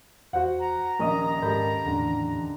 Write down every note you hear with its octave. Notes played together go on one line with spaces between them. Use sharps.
E2 F#4 C5 F#5
A#5
A#1 D#2 C#4 A#4 D#5
G#2 G4 A4 A#4 B5 G6
E2 A2 D3 E3